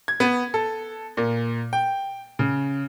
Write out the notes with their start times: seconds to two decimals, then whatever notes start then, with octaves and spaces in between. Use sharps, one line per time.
0.08 G#6
0.20 B3
0.54 A4
1.17 A#2
1.73 G5
2.39 C#3